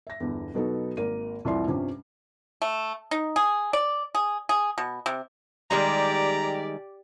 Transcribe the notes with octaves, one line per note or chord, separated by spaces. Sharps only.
E5 A#6
G1 E2
B2 F#3 B3 D#4 A4
G#1 A#3 A#4 D#7
C2 F2 E3 E4 D5 C6
G2 C3 F3 G3 C#4
A3
D#4
G#4
D5
G#4
G#4
B2
C3
D#3 G3 G#3 G4 D5 A#5